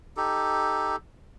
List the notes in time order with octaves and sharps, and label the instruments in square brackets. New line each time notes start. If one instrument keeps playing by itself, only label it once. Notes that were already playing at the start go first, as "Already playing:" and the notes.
[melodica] D#4 G4 A4